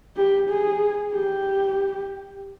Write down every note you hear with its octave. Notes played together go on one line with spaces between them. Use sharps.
G4
G#4
G4